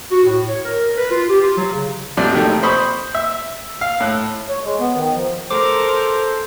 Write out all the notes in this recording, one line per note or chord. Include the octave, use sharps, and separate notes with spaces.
F#4
A2
C#5
A#4
B4
F4
G4
F4
F#3
C#3
A1 C3 F3 F#3 D5 D6
C3 D#3 F3 A3
C5 B5 C#6 D#6
E5
F5
A2 F#6
C#5
G#3
B3
D#3
F3
A4 A#4 C5 D6